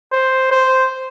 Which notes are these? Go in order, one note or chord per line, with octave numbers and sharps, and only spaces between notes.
C5
C5